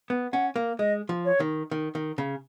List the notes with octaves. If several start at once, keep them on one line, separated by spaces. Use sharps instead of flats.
B3
C#4 F#5
A#3
G#3 D#5
F3
C#5
D#3
D#3
D#3
C#3